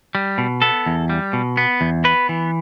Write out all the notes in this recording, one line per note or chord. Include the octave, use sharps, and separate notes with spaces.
G3
B2
B3 A4
E2
G3
B2
B3
E2
B3 B4
E3